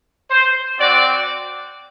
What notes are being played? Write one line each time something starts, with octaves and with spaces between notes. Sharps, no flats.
C5
C4 F#4 D5